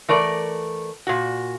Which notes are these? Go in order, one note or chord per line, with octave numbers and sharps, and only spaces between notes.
E3 A3 A#4 D5
A#2 F#4